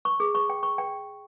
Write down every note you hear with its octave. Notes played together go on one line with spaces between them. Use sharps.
C#6
G#4
C#6
G5
C#6
G5